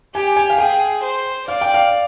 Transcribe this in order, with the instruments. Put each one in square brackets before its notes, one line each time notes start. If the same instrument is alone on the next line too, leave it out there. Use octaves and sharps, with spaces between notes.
[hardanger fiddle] G4 [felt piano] G#5
[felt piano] G#5
F5
[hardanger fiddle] G#4 [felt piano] G5
[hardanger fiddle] C5
[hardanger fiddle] D5 [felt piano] F5
[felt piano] G5
F5